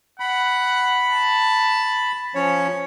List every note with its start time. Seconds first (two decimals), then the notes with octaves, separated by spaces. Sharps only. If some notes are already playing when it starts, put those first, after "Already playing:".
0.20 F#5 B5
1.08 A5
2.35 F3 C#4 C#5